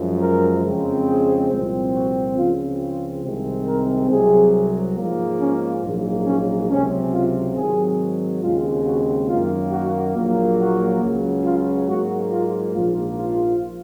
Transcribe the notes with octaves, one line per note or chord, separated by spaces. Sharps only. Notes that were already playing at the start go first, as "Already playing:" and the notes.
Already playing: F#2 F3 G#3
A#4
F2 C#3 G#3 C4
G#4
C2 A#2 F3 C4
F#4
C#2 C#3 F3 C4 F4
F4
C2 C3 D#3 G#3 C4
A#4
C2 C3 F#3 G#4
G#2 F3 A#3
C#4
A#1 G#2 F#3 A#3
C#4
C#2 C3 F#3 C4 C#4
F4
G#2 D#3 F#3 C4 G#4
D#2 C#3 G#3 C4 F4
F#4
F#2 D#3 A#3 F4
F#4
A#1 A#2 F#3 A#3
F#4
C#2 C#3 F#3
F4
G#2 F#3 A#3 F#4
F4
A#1 G#2 F3 A#3 F4
F4